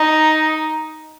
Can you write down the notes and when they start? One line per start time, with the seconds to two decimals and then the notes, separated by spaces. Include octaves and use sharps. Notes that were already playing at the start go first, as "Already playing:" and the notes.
Already playing: D#4